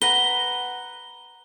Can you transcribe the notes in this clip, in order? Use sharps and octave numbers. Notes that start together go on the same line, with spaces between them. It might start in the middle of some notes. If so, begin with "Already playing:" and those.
B4 F#5 A#5 G7